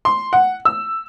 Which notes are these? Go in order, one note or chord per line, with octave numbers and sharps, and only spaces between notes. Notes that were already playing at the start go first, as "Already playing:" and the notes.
C6
F#5
E6